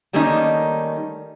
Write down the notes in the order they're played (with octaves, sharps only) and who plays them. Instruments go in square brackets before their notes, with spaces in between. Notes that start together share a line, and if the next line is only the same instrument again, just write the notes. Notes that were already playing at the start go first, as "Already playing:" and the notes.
[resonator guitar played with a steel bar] D#3 G3 A3 A#3 C#4 D#4